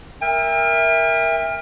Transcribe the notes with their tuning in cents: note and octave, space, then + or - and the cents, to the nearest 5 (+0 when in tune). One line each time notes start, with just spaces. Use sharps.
A#4 +5 E5 +0 G5 +45